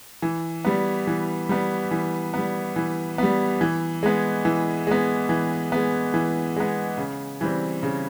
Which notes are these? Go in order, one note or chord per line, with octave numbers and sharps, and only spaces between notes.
E3
G3 B3
E3
G3 B3
E3
G3 B3
E3
G3 B3
E3
G#3 B3
E3
G#3 B3
E3
G#3 B3
E3
G#3 B3
C#3
E3 G3 C4
C#3